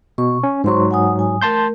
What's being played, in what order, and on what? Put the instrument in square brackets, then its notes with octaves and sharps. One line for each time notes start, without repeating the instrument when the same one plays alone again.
[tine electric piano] B2 [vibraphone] C#6
[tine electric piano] C#4
[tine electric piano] G#2 F#3 [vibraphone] C5 C6 C#6
[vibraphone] F#5 G#5 D#6
G#5 D#6
[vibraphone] A3 A#4 [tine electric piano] A5 C6 G6